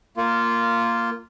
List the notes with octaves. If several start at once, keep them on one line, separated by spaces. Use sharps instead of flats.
A#3 F4